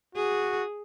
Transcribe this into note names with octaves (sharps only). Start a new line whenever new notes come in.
F#4 G#4